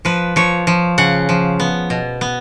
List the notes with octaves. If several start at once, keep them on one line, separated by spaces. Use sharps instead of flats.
F3 B4
F3 C#5
F3
C#3 F#5
F3
B3
B2
B3